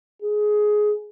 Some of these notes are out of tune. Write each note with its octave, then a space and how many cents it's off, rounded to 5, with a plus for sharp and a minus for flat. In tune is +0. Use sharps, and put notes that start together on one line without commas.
G#4 +15